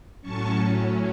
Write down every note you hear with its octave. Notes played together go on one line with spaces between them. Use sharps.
A2 F#3 C#4 A5 C#6